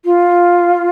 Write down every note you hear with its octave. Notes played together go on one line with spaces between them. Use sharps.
F4